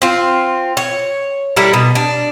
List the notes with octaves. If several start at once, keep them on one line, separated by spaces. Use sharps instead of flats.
C4 F4
C#5
G3 E4 A4 A#4
B2
D4